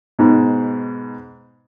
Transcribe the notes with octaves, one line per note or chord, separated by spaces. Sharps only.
G#2 B2